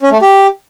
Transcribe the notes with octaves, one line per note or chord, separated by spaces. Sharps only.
C#4
A3
G4